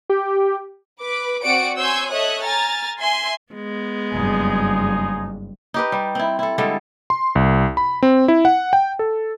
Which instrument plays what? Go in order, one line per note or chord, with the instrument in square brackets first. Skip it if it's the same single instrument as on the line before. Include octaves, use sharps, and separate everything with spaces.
[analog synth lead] G4
[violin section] B4 D6
C4 F#4 D5 F#5 C#7 D7
C#5 G#5 C6 E6 G6 G#6
A4 C#5 D#5 E5 D#6 F#6
G#5 A#5 F6 A6
E5 G#5 C6
[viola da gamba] G#3 B3
[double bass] F#1 G2 [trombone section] F3 D#4 G#4
[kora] D#4 G4 B4
G3
C4 E4
E4 A4
D3 G3 G#3 A4
[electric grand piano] C6
C2
B5
C4
E4
F#5
G5
A4